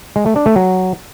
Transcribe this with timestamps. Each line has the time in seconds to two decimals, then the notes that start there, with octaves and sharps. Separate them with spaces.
0.16 G#3
0.26 A3
0.36 D4
0.46 A3
0.56 F#3